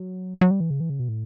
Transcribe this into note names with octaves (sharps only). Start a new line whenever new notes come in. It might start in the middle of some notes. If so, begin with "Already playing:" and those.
Already playing: F#3
F#3
G3
E3
C#3
E3
C#3
B2
A2